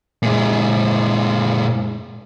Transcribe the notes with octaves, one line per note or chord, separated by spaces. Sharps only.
A#2 G#3